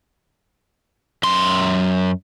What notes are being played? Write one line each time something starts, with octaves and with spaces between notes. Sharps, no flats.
F#2 C6